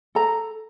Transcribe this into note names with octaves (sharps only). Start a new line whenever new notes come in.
A4 A#5